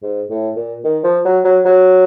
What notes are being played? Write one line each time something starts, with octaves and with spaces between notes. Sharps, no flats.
G#2
A2
A#2
D#3
F3
F#3
F#3
F#3